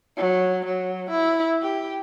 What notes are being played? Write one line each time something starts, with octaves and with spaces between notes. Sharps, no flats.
F#3
F#3
E4
G4